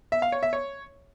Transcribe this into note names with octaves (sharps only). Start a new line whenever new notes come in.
E5
F5
C#5
E5
C#5